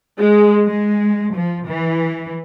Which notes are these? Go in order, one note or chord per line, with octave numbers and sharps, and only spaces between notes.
G#3
G#3
F3
E3